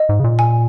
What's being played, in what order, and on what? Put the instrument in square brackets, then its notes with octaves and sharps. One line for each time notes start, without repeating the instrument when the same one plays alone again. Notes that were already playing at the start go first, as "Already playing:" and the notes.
Already playing: [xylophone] D#5
[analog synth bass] G#2
C#3
A#2
[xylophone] G#5